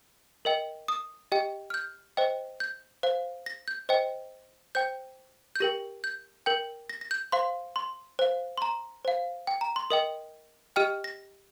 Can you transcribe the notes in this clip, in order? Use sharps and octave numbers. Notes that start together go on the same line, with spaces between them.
A#4 D#5 G5
D#6
G4 D#5 G5
F6
G6
C5 D#5 G5
G6
C5 F5
A#6
G6
C5 D#5 G5
C5 G5 G6
G6
G4 A#4 G5 A#6
G6
A#4 G5 G6
A#6
A#6
G6
C5 F5 C6
C6
C5 F5
C6
A#5
C5 F5
G5
A#5
C6
A#4 D#5 G5 D#6
G4 D#5 G5 F6
A#6